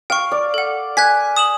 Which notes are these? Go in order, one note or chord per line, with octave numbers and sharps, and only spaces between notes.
F5 G5 C#6
D5
A4 F#5
G#5 F#6 G#6 B6
D#6 E7 F#7